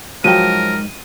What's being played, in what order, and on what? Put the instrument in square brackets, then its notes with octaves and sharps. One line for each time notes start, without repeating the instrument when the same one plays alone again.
[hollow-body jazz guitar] G#2 G5 [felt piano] F3 F#3 [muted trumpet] A#4 [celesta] D#7